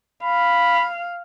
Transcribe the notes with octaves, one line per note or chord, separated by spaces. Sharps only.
F5 B5